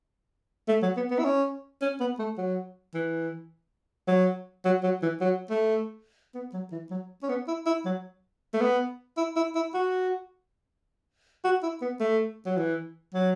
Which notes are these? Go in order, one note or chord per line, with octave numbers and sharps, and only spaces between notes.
A3
F#3
B3
B3
E4
C#4
C#4
B3
A3
F#3
E3
F#3
F#3
F#3
E3
F#3
A3
B3
F#3
E3
F#3
C#4
B3
E4
E4
F#3
A3
B3
E4
E4
E4
F#4
F#4
E4
B3
A3
F#3
E3
F#3